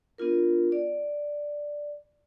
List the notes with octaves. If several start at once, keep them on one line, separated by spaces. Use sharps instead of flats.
B3 D4 F4 A#4
D5